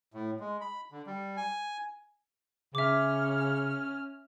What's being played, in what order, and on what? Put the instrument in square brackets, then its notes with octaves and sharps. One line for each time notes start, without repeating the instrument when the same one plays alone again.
[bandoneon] A2
G#3
B5
D3
G3
G#5
[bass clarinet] C#3 [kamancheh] C#4 F6 [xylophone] E5 D6